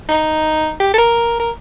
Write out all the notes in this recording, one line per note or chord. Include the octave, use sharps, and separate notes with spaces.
D#4
G4
A4
A#4
A#4